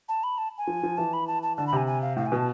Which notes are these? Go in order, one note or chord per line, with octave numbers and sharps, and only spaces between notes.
A5
B5
A5
G#5
F3
F3
E3 A5
B5
A5
A5
D3 A5
B5
C3 G#5
G#5
F5
A2 F5
G#5
B2
A5